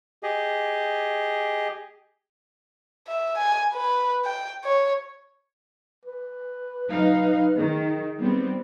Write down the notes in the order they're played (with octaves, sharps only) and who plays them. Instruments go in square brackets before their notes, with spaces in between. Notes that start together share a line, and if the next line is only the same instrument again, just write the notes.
[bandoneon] G4 G#4 D#5
[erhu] E5
G#5
B4
G5
C#5
[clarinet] B4
[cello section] F#3 D#4 F5
[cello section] D#3 [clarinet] G#4
[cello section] G3 B3 C4